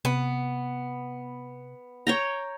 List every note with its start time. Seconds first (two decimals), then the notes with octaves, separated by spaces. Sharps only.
0.05 C3 B3
2.07 C#5 G5 A#5